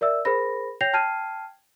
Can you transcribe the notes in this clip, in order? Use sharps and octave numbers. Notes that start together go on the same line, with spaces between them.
A#4 D5 E5 E6
G#4 A#4 C5 B5 A#6
C#5 G5 G6 A#6 C7 F7
G5 A5 F6 G#6 C7 D#7